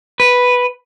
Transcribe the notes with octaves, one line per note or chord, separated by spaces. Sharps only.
B4